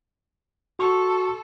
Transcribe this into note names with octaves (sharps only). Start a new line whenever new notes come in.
F#4 A4 C6 C#6